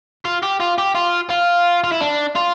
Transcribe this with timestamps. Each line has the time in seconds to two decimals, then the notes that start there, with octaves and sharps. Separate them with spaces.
0.25 F4
0.43 G4
0.60 F4
0.78 G4
0.95 F4
1.30 F4
1.84 F4
1.92 E4
2.01 D4
2.35 F4